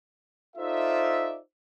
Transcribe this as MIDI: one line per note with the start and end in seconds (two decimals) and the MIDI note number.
0.57 1.38 63
0.57 1.38 65
0.57 1.38 69
0.57 1.38 72
0.57 1.38 74
0.57 1.38 76